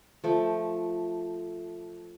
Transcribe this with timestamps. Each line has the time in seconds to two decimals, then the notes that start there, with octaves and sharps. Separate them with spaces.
0.24 F3 A3